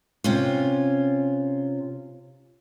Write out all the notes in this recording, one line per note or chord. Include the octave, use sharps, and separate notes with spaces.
C3 C#4 F4